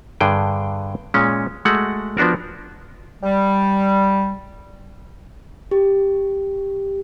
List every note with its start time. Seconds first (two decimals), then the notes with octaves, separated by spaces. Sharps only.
0.21 G2 D3 G#4 G5
1.14 A#2 G#3 C#4
1.65 G#3 A3 F#4 F#5
2.17 F3 B3 D4 F#4 A#4
3.22 G3
5.71 G4